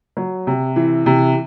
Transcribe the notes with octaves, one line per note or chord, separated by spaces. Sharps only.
F#3
C3
E3
C3